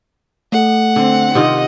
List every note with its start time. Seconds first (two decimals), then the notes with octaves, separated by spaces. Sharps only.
0.52 A3 A4 F#5
0.96 D3 C4
1.35 C3 D#3 F4 D#5